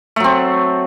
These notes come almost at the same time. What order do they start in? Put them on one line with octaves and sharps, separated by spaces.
A3 F#3 C4